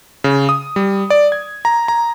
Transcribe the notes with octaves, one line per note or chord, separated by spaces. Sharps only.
C#3
D#6
G3
D5
G#6
A#5
A#5